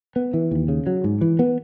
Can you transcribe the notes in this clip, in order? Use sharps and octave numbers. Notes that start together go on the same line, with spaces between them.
B3
E3
D#2
C#3
F#3
G#2
E3
B3